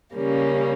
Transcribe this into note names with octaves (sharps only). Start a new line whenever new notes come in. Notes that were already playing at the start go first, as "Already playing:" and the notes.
C#3 G3 A#3 C#4